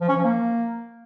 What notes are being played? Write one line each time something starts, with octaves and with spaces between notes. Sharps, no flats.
F3
C#4
F3
A#3